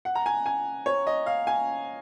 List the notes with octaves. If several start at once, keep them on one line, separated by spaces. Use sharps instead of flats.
F#5
A#5
G#5
G#5
C#5
D#5
F5
G#5